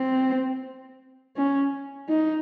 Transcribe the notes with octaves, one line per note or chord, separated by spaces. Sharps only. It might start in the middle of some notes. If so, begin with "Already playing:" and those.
Already playing: C4
C#4
D#4